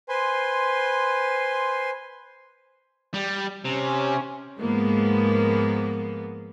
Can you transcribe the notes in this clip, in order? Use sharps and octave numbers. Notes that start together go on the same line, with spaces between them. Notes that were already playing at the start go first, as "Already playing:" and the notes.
B4 C5 G#5 C6
G3
C3 C#4
G#2 F3 G#3 A#3 B3